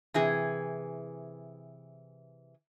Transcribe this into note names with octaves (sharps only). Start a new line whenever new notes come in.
C3 E3 G#4